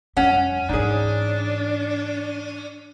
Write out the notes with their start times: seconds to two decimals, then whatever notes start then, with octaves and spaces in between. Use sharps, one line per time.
0.17 F2 G3 C#4 F#5
0.69 G#2 E3 D4 D#4 G#4